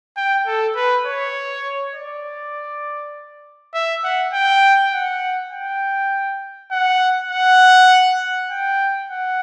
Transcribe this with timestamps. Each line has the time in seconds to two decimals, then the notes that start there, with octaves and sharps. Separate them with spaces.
0.17 G5
0.47 A4
0.76 B4
1.07 C#5
1.95 D5
3.75 E5
4.04 F#5
4.33 G5
4.93 F#5
5.53 G5
6.72 F#5
7.31 F#5
8.51 G5
9.10 F#5